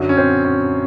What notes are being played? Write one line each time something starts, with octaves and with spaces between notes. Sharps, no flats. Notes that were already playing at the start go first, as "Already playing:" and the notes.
Already playing: F#2 D3 F#3
C#4
C4
C#4